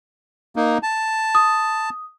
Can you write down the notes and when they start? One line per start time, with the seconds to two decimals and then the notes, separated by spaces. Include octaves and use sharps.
0.56 A#3 D#4
0.83 A5
1.35 D#6